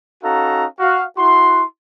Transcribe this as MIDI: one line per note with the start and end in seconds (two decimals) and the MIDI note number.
0.23 0.65 61
0.23 0.65 63
0.23 0.65 66
0.23 0.65 69
0.23 0.65 77
0.23 0.65 82
0.80 1.03 66
0.80 1.03 77
1.17 1.63 64
1.17 1.63 66
1.17 1.63 84